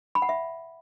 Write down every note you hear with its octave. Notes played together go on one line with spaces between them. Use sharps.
B5
F#5
E5